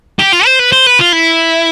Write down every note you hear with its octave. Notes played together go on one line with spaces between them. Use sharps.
G4
F4
C5
B4
C5
B4
F4
E4